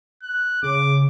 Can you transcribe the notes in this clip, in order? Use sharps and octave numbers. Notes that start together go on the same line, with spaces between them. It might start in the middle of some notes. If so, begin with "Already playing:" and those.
F#6
C#3 D6